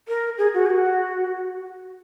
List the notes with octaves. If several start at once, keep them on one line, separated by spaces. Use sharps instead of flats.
A#4
G#4
F#4
G#4
F#4